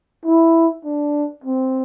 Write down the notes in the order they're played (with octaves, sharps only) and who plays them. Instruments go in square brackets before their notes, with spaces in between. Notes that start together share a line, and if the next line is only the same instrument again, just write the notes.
[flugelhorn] E4
D4
C4